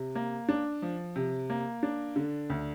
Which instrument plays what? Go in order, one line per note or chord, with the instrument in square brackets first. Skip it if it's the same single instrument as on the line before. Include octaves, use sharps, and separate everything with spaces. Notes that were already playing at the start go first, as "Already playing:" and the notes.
Already playing: [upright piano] C3
A#3
D4
F3
C3
A#3
D4
D3
D2